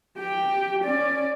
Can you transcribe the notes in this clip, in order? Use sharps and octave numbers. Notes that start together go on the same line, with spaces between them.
G4 G5
C#4 D5